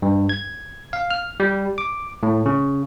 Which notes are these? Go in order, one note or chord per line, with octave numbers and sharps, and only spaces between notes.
G2
G#6
F5
F6
G3
D6
A2
C#3